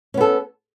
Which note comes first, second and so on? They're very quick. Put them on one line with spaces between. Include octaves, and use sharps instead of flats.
C#4 B3 A4